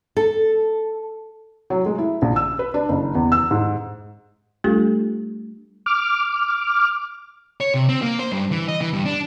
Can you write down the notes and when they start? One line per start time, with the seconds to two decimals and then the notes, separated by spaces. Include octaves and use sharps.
0.17 A4
1.70 F#3
1.86 G#3
1.98 E4
2.22 A#1
2.36 E6
2.59 B4
2.74 D4
2.89 F#1
3.15 E2
3.32 E6
3.51 G#2
4.64 G3 A3 D4 F4 G4 A4
5.86 D6 F6
7.61 C#5
7.74 C3
7.89 C4
8.02 A#3
8.19 C5
8.32 G2
8.51 E3
8.68 D#5
8.81 E3
8.93 G2
9.05 D4